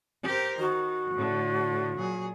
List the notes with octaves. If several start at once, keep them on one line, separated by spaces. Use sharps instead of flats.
G4 A#4 C5
D#3 F#4
A2 D3
A#2 F#3 G#4